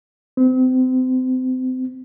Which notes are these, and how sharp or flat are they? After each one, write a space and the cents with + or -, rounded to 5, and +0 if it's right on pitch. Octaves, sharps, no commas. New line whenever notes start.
C4 -30